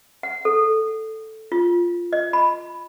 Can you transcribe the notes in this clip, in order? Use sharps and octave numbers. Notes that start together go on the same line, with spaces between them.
F#5
A4
F4
D#5
B5